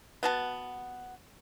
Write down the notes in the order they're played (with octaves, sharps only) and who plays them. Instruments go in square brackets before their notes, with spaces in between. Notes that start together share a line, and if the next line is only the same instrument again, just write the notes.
[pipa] B3 F#4 A5